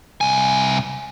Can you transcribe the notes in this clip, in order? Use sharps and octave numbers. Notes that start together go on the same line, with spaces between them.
C2 G#5